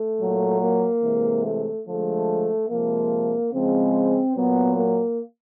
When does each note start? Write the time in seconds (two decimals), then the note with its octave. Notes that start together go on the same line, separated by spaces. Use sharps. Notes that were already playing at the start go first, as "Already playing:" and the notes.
Already playing: A3
0.19 A#2 F#3
0.61 A#3
1.03 C3 E3 G#3
1.45 A3
1.86 D3 F3 G#3 A3
2.70 C3 F3 G#3 A#3
3.53 C#3 F3 G#3 C4
4.36 A#2 F#3 B3
4.77 A#3